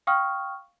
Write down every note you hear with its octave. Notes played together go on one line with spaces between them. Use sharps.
F5 G5 C#6 D#6 F6